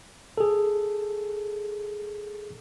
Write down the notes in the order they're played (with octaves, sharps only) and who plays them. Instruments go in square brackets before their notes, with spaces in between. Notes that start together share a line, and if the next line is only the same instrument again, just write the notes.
[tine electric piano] G#4 A4